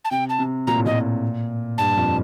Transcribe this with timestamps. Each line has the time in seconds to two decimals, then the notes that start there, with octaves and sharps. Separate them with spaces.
0.05 A5
0.11 C3 G5
0.29 A5
0.39 C3
0.67 A#2 A#5
0.76 A2
0.85 A#2 D#5
1.78 G2 A5
1.97 F2